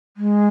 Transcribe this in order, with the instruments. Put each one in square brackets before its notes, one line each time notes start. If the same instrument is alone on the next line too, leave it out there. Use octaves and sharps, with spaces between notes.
[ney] G#3